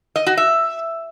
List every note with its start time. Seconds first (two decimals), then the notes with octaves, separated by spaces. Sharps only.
0.16 D#5
0.27 F#4
0.37 E5